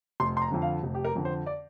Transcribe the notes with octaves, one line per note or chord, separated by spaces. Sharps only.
F1 C6
C6
A#5
F2 D3
F5
F1
G4
A#4
F2 D3
C5
D5